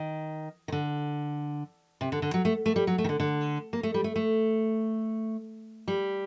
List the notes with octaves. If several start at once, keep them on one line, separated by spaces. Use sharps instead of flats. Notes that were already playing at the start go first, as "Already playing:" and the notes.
Already playing: D#3
D#3
D3
C3
D3
D3
F#3
A3
A3
G3
F#3
A3
D#3
D3
D3
A#3
A3
G3
A3
A3
G3